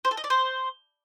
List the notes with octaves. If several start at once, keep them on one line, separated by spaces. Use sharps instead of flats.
C5
A4
D#5
D5
C5